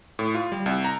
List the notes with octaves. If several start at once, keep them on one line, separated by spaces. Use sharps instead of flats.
A2
F4
G3
C2
A#5